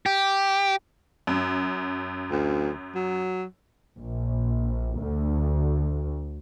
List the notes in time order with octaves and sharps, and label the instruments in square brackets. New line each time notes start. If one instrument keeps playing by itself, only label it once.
[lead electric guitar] G4
[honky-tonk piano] F#2
[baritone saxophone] D2
F#3
[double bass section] A#1
D2